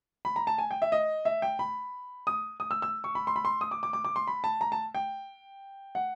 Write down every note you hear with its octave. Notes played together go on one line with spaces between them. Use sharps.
B5
A#5
A5
G#5
G5
E5
D#5
E5
G5
B5
D#6
D#6
E6
E6
C#6
B5
C6
B5
C6
D#6
D6
D6
D6
D6
C6
B5
A5
A#5
A5
G5
F#5